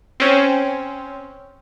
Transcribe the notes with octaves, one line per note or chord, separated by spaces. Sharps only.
C4 C#4